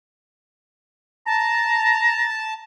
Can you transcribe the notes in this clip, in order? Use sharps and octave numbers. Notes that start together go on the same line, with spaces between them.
A5 A#5